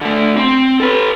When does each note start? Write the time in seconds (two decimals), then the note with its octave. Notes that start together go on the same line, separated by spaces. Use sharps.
0.01 D3 A3
0.37 C4
0.80 A4 B4